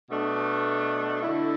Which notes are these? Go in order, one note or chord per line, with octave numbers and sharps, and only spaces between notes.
B2 A3 D4
D3 A3 E4